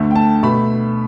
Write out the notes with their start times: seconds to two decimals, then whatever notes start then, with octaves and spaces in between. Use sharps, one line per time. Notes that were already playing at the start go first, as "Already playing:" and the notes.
Already playing: D2 D3 A3
0.11 G5
0.16 A5
0.43 B2 A3 B5